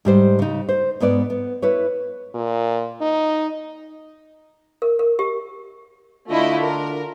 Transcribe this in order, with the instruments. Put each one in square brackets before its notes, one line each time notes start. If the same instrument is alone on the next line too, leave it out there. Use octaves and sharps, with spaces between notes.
[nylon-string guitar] G#2 G3 C5
C#3 D#4
C5
G#2 B3 B4 D5
B3
E4 B4 C#5
[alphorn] A#2
D#4
[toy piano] A#4
A#4
G4
[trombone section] D3 D4 F4 [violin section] A3 E4 D#5
[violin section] A#4